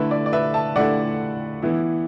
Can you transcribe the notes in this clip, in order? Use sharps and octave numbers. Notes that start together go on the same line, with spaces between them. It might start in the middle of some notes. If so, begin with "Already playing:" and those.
Already playing: D3 A3 E4 B4 E5
D5
D5
B4 E5
E5 A5
D3 A3 E4 D5 F#5
E3 B3 E4